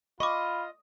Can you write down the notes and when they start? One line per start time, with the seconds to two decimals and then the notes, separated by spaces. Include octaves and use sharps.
0.20 F4 D#5 B5 C#6 D6